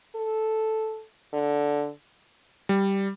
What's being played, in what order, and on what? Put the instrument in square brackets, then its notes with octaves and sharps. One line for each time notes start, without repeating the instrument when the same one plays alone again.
[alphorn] A4
D3
[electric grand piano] G3